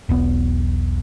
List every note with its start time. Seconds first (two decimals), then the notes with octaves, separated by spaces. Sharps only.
0.09 E1 B1 B3